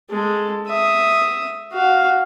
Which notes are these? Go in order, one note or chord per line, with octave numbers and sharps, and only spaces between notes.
G#3 A4
E5 D#6
F#4 F5